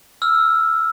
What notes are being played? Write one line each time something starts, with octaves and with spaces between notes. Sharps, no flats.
E6 F6